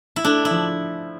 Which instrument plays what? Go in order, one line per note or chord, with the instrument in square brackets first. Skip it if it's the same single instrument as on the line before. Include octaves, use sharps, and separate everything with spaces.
[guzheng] E4
[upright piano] A3 [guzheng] D4
[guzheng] E4
[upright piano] F3